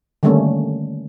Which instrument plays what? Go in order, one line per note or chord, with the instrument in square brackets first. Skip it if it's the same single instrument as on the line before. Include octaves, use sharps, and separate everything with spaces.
[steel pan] D3 D#3 G3 A3 A#3 C#4